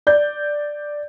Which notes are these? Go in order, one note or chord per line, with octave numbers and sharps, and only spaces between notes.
D5 G6